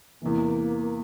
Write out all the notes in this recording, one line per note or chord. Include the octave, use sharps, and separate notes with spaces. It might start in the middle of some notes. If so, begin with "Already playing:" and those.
E2 C3 E3 A#3